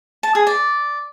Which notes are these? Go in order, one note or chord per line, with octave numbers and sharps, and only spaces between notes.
A5
G#4
D5